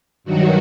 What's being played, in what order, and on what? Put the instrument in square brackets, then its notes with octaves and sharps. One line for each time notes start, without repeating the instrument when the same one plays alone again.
[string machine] G2 D#3 F#3 F#4